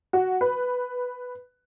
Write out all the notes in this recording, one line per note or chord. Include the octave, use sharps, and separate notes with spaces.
F#4
B4